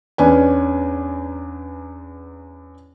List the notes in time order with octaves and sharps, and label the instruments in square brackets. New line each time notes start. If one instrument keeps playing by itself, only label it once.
[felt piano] E2 C#4 D4 B4 G#5